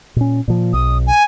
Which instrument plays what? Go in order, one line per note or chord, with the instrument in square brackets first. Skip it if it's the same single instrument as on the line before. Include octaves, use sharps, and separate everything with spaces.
[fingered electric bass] A#2 C#4
A#2 F3
[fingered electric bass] B1 [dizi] D#6
[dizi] G#5